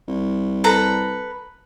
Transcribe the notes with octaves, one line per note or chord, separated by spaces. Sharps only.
C2
A4 B4 A#5